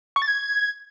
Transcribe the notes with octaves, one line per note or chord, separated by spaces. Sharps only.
C#6
A6
G#6